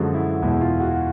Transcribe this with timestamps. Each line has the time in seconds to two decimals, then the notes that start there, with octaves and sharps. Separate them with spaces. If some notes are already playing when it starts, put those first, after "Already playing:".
Already playing: F#2 D3 F3 G#3 F#4
0.14 E4
0.42 E2 B2 G#3 E4
0.61 F4
0.80 F#4